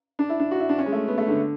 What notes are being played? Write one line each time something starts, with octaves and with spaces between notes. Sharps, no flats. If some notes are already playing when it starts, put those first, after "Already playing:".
D4
E4
D4
F#4
E4
D4
C#4
G#3
A3
B3
A3
D3